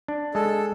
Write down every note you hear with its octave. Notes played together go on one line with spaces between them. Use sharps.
D4
G#3 A4